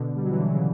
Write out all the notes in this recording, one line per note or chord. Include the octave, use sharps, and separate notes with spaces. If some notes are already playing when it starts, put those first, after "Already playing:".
Already playing: B2 D3
G3
F#3
E3
B2 D3
F#3
C#3 E3